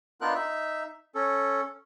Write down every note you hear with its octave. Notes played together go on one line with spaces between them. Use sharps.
B3 D4 D#4 F4 A#4 F#6
D#4 E5
C#4 A4